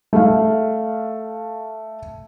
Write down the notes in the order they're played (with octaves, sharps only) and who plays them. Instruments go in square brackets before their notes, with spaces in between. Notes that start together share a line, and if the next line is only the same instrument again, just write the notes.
[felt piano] A3 F5